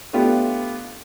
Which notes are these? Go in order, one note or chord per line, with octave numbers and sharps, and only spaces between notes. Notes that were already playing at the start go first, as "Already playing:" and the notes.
A3 B3 D4 F4 G4